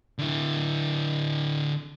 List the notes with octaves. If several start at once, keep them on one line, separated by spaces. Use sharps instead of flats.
D3 E4